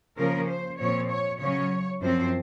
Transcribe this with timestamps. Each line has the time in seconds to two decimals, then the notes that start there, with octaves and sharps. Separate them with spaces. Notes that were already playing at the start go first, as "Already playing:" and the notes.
0.18 C#3 F3 A#3 C#4 A#4
0.49 C5
0.79 A#2 F3 C4 C#5
1.10 C#5
1.40 C#3 F#3 C#4 C#5
2.01 F#2 F3 C4 C5